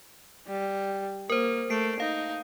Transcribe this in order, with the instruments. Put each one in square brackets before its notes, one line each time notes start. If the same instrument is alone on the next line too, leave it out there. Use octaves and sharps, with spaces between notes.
[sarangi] G3
[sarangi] A#3 [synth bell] A#4 C5
[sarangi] A3 [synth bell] C7 D7
[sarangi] D#4 [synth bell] F5